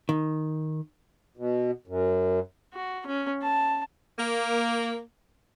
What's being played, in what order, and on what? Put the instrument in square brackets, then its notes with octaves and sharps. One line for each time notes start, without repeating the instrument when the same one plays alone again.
[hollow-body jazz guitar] D#3
[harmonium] B2
F#2
[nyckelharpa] F#4
C#4
A5
[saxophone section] A#3